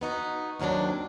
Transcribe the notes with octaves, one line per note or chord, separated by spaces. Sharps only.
B3 D#4 F#4
D#2 D#3 F#3 C4 D4